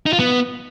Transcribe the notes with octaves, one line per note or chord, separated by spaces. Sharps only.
D#4
F4
B3